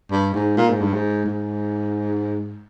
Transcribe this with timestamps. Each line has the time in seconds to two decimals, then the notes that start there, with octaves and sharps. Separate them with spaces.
0.11 G2
0.34 G#2
0.57 A#2
0.70 G#2
0.81 G2
0.93 G#2
1.26 G#2